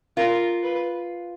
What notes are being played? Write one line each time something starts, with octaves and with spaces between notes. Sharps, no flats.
F4 A#4
B4